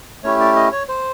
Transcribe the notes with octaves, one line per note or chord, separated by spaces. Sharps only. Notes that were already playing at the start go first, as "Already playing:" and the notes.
A3 C#4 E4 G4 C#5
D5
D#5
C#5
C5